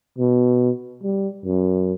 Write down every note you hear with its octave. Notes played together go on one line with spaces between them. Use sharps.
B2
G3
F#2